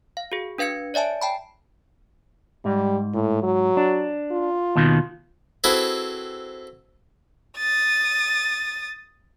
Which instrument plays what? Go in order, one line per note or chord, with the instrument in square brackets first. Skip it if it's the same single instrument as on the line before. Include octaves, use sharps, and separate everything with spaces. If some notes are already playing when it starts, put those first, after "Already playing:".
[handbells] F5
F#4 G#4
D4 B4 F5 G#6 C#7
C#5 D5 E5 G#5 A5
G5 A5 B5
[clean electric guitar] G#2 [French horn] G3
[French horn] A2
F#3
[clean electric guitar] D4
[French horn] F4
[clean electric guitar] D#2 B2 D#3
[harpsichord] C4 E4 F#4 G#4 A4 B4
[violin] D#6 A6